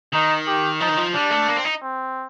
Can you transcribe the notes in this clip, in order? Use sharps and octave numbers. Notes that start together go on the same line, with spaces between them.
D#3 D#4
G4
F3 D#4
D#3
F3
G3 D4
A3
A#3
C4
D#4
C4